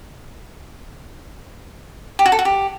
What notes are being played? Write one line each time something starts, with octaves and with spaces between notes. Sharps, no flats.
G4
F#4
A4
F#4
G4